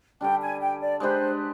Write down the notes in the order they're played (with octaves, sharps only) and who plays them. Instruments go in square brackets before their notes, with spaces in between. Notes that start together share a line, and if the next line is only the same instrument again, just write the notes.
[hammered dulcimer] D3 G3 D4 [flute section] G5
[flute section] G#5
G5
D5
[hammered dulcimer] G#3 D4 G4 B4 [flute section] C5